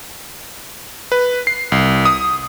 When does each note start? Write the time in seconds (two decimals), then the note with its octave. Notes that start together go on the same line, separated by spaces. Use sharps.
1.12 B4
1.47 C7
1.72 C2
2.05 D#6